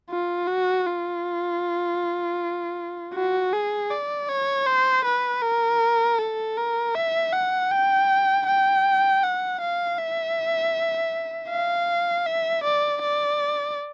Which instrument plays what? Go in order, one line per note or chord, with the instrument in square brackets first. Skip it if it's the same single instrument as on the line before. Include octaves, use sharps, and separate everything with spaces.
[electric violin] F4
F#4
F4
F#4
G#4
D5
C#5
C5
B4
A#4
A4
A#4
E5
F#5
G5
G5
F#5
F5
E5
F5
E5
D5
D5